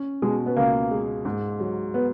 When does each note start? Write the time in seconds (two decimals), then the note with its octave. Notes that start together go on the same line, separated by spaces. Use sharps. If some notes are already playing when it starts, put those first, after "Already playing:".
Already playing: C#4
0.22 B2 G#3
0.46 B3
0.56 C#2 A#3
0.91 G#3
1.25 G#2
1.60 F#3
1.94 B3